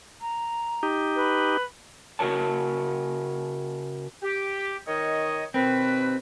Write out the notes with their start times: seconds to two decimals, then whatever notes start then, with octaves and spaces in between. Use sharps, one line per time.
0.21 A#5
0.83 D#4 G4
1.15 B4
2.19 C#3 F#4 A#4 C#5 A5
4.22 G4
4.86 D#3 C#5 D#5
5.54 D#2 B2 C4 B4